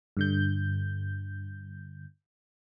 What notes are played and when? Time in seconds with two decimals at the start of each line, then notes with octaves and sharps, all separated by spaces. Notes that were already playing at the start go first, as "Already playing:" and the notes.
0.17 G2 D3 G6